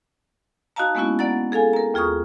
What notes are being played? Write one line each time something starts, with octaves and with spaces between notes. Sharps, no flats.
D#4 F#4 D#5 F5 A5 A#5
G#3 A#3 B3 C#4 E4 F#4
B3 D5 F#5 A#5 A6
G#4 A4 F5 G#5
A#4 A#5
D#2 F4 G#4 A#5 C#6 D#6